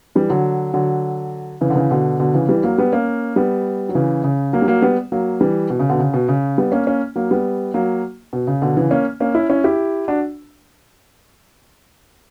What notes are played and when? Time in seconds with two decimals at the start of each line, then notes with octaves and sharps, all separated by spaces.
0.15 E3 G3
0.30 D3 F#3
0.74 D3 F#3
1.61 C#3 E3
1.70 D3
1.76 C#3 E3
1.91 B2 D3
2.20 B2 D3
2.34 C#3 E3
2.49 E3 G3
2.64 F#3 A#3
2.78 G3 B3
2.93 A#3 C#4
3.36 G3 B3
3.89 F#3
3.95 C#3 E3
4.24 C#3
4.53 F#3 A#3
4.62 G3
4.68 F#3 A#3
4.82 G3 B3
5.12 F#3 A#3
5.41 E3 G3
5.70 B2
5.79 C#3
5.89 B2 D3
5.99 C#3
6.14 B2
6.28 C#3
6.58 G3 B3
6.72 A#3 C#4
6.87 A#3 C#4
7.16 F#3 A#3
7.31 G3 B3
7.74 F#3 A#3
8.33 B2
8.47 C#3
8.62 B2 D3
8.77 C#3 E3
8.91 A#3 C#4
9.20 A#3 C#4
9.35 C#4 E4
9.50 C#4 E4
9.64 E4 G4
10.08 D4 F#4